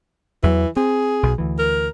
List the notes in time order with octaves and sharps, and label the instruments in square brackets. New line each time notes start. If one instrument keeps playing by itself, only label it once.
[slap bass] E2 F#3 [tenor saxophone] E3
[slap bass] C4 [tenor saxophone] G#4
[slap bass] B1
D2 E3
[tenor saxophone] A#4